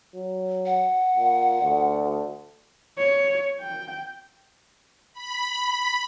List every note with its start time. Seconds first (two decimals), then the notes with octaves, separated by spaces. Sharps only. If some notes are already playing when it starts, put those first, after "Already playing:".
0.15 F#3
0.66 F#5
1.16 A#2
1.62 D2
2.98 C#5
3.61 G5
5.13 B5